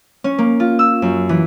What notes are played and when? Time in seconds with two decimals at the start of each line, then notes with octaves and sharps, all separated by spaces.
0.24 C#4
0.38 A#3
0.60 F4
0.79 E6
1.02 F#2
1.29 E3